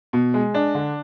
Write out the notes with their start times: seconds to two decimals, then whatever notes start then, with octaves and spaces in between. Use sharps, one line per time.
0.13 B2
0.34 G#3
0.54 D4
0.75 D3